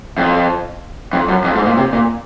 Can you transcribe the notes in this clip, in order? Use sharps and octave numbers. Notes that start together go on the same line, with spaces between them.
F2
F2
F#2
F2
G#2
A#2
C3
A#2